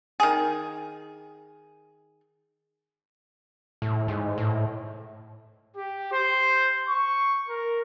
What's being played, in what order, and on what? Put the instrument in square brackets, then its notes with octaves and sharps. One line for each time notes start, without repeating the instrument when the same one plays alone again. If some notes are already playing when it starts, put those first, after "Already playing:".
[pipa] D#3 G#4
[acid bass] A2
G#2
A2
[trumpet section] G4
C5
C#6
A#4